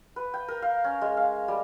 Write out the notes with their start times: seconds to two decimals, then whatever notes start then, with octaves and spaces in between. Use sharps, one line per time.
0.16 B4
0.34 G5
0.48 A#4
0.62 F5
0.84 C#4
1.01 G#3
1.17 F5
1.48 G3